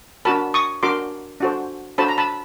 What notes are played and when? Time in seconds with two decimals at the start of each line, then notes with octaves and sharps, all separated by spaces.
0.25 D4 F#4 A#4 A5 B5
0.54 C#6 D#6
0.83 D4 F#4 A#4 C6 D6
1.40 D4 F#4 A4 C5
1.98 D4 F#4 A4 C5 A5 B5
2.08 A#5
2.18 A5 B5